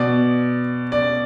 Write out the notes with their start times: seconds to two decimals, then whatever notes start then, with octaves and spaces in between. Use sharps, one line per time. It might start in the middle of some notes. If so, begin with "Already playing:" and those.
Already playing: B2 D5
0.92 D5